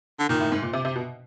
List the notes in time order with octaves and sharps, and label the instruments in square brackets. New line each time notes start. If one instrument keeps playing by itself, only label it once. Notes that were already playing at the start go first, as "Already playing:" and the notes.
[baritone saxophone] D3
[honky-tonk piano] A#2 [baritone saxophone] D#3
[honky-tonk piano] A2
G#2
A#2
C3
C3
B2